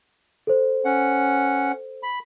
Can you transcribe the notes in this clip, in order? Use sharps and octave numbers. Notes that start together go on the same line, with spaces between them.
A4 C5
C#4 F#5
B5